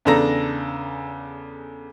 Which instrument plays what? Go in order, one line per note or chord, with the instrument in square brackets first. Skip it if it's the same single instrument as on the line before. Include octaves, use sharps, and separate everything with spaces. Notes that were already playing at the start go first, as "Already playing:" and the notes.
[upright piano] E2 C#3 D4 A4 A#5 A#6